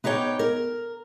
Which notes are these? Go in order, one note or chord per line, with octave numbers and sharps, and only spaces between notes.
B3 D#4 G4 C#5 G5
A#4